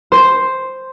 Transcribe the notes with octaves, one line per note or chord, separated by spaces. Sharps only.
C5